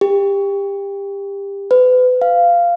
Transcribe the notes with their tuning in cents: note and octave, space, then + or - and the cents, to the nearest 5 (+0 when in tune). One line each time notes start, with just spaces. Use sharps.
G4 +25
B4 +35
F5 -10